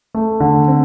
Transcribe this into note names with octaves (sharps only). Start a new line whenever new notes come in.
A3
D3
C4